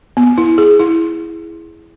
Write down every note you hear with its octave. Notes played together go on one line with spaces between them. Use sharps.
B3
E4
G#4
E4